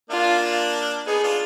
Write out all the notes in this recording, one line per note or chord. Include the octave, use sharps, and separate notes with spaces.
A#3 D4 F4
B3 D#4 G#4
D4 F4